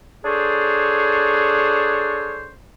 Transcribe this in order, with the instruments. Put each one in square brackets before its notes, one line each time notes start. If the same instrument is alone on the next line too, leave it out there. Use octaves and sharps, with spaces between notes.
[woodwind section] D4 G#4 A4 C5 C#5